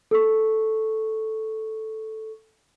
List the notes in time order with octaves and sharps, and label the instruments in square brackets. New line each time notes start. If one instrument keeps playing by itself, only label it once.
[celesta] A4 C#6